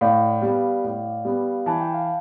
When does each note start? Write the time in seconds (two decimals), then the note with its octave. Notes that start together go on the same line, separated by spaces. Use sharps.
0.01 A2 D5 F5
0.42 G3 B3
0.84 A2
1.25 G3 B3
1.66 E3 A5
1.80 G5
1.94 F5